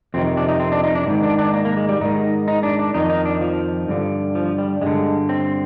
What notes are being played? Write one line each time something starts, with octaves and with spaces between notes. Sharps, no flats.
F2 C3 D#3 C4
D4
D#4
C4
D4
D#4
D4
G#2 D#3
D4
D4
A#3
A#3
G#3
G3
G#2 D#3 D#4
D#4
D4
D4
F2 D#3 D#4
D#4
D4
F3
G2 D3
F3
G3
G2 D3 G#3
C4